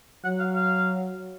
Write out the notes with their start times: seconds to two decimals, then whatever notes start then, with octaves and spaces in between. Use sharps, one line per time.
0.24 F#3 F#5
0.39 F5
0.54 F5